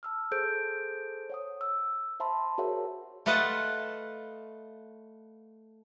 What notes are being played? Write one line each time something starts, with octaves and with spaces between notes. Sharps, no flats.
A5 E6 F6
G#4 A4 C5 G6 D7
C#5 F#5 D#6
E6
C5 E5 A5 B5 C6
F#4 G#4 A#4 C#5 E5 F#5
A3 F4 B4 D#5 F#5 A5